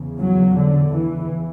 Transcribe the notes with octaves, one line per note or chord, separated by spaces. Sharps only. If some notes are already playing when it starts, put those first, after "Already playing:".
Already playing: E2 C#3
F#3
D3
E3